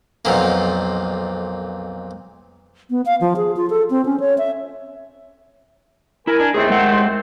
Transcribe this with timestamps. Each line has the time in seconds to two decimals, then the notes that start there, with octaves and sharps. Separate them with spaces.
0.25 B1 F2 A#2 A#3
2.90 B3
3.06 F5
3.21 F3
3.36 G#4
3.56 F4
3.70 A4
3.90 C4
4.05 C#4
4.20 C#5
4.38 E5
6.27 E4 A#4 G#5
6.40 D4
6.54 D#2 A3 C4 G#4
6.70 G#3 F#5